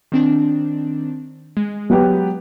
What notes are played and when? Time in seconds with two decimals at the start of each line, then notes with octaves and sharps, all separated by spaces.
0.12 D#3 C4 D4
1.57 G#3
1.90 F#3 B3 G4